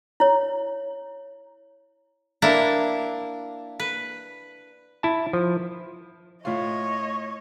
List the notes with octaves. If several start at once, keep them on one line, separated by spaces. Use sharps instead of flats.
E4 C#5
A#3 D4 E4
B4
E4 A5
F3
A2 F4 C#5 D#5